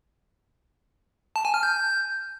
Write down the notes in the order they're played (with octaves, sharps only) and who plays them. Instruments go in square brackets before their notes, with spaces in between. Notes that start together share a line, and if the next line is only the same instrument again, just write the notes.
[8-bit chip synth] A5
G#5
F6
G6